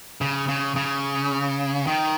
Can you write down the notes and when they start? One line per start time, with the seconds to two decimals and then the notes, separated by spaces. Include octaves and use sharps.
0.21 C#3
0.48 C#3
0.76 C#3
1.87 D#3